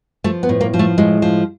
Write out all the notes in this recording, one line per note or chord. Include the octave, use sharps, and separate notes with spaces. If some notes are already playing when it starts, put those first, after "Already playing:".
F3 A3
B3
A2
A#3
F3
A3
A2 G#3
F3